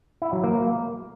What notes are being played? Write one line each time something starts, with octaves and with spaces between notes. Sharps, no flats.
E4
F#3
A#3